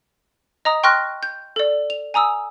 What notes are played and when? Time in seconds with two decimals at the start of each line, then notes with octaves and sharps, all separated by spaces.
0.65 D#5 A#5 D#6
0.83 G5 C6 C#6 F6 F#6 A#6
1.23 G6
1.56 A4 D5
1.90 F7
2.14 G#5 A#5 D#6 E6